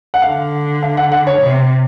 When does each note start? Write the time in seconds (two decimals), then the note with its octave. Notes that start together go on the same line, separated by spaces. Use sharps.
0.14 F#5
0.22 D3 F5
0.83 F5
0.97 F#5
1.12 F#5
1.27 C#5
1.41 C3